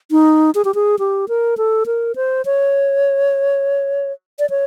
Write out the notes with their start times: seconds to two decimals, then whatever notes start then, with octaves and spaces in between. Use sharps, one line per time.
0.11 D#4
0.55 G#4
0.65 G4
0.75 G#4
0.99 G4
1.29 A#4
1.57 A4
1.86 A#4
2.16 C5
2.45 C#5
4.39 D5
4.50 C#5